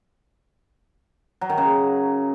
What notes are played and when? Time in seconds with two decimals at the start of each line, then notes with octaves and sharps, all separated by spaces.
1.41 F#3
1.49 D#3
1.58 C#3